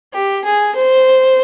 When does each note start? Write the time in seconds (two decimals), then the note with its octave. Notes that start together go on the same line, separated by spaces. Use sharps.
0.13 G4
0.45 G#4
0.76 C5